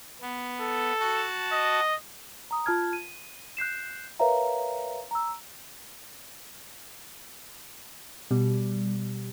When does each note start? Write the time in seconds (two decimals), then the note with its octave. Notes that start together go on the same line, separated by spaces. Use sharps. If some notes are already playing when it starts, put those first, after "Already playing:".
0.21 B3
0.61 A4
1.00 F#4 A5
1.52 D#5
2.51 A#5 D#6
2.66 F4 A5 F6 G#6
2.93 D#7
3.57 F#6 G6 C7 E7
4.20 A#4 B4 C#5 E5 F5 A#5
5.11 A#5 E6
8.31 B2 G3